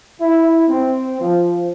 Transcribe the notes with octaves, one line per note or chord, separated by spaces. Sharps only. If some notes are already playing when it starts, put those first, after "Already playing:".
E4
C4
F3